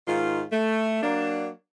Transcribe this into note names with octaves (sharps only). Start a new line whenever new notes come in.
G#2 D#3 F4
A3
F#3 A#3 D4